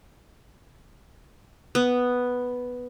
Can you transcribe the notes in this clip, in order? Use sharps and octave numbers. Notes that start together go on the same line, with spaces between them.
B3